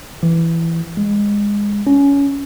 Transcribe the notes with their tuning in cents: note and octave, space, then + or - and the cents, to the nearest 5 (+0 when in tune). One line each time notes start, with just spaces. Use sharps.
E3 +10
G#3 -20
C#4 +20